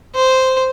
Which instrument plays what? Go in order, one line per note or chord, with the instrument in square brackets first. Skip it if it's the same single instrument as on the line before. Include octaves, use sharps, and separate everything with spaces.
[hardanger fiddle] C5